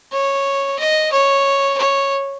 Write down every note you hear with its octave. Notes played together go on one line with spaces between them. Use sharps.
C#5
D#5
C#5
C#5